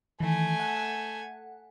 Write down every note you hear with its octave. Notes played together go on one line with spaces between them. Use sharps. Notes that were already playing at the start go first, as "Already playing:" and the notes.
D#3 E3 A3 G#5
F#5